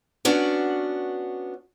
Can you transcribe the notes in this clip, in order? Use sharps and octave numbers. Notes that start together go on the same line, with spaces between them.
B3 C#4 D4 F#4